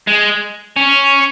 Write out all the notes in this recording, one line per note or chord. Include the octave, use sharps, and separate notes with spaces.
G#3
C#4